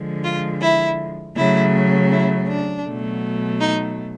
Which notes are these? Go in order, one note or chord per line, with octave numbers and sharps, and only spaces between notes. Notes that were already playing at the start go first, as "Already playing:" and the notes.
Already playing: D3 F3 G#3
F4
E4
C#3 F#3 A3 E4
E4
D4
B2 F#3 A3
D#4